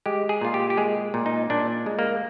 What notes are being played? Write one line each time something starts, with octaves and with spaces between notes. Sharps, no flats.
G#3 G4
G#4
A#2 F4
G4
G4
G#3 G#4
A#2
D#4
A#2 D4
G#3
A#3